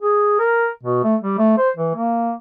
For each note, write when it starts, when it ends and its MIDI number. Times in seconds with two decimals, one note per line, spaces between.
0.02 0.38 68
0.39 0.69 70
0.83 1.04 47
1.04 1.16 57
1.23 1.38 55
1.38 1.57 57
1.58 1.70 72
1.77 1.93 52
1.95 2.33 58